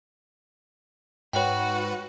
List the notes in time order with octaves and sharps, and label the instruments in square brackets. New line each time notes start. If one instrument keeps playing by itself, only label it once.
[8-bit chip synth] G#2 B4 [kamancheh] F#4 [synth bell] C#5 G5